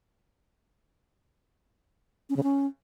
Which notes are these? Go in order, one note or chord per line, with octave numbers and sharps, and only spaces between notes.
C#4
C#3
C#4